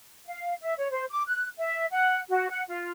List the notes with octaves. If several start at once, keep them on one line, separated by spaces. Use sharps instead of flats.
F5
E5
C#5
C5
D6
F#6
E5
F#5
F#4
F#5
F4